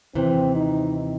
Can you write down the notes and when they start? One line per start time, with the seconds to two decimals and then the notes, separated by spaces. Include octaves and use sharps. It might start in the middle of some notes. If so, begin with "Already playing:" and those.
0.15 D#2 C3 E3 C4
0.55 D#4